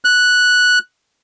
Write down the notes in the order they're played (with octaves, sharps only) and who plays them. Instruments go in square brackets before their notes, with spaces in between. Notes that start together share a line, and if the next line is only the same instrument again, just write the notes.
[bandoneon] F#6